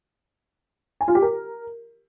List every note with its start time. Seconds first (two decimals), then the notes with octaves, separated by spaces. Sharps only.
1.01 G#5
1.08 F4
1.15 G4
1.22 A#4